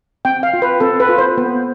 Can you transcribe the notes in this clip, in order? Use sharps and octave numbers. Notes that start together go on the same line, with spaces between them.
C4 G5
F5
F4
B4
C4 A4
B4
F4
C5
B3